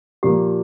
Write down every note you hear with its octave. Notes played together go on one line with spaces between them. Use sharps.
A#2 F3 A#3 G4